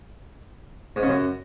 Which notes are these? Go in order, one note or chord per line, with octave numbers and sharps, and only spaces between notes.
G#2
C#3
F#2